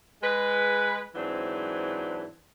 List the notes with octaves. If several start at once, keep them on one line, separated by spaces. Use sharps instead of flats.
G#3 B4
G#2 E3 F#3 C4 D4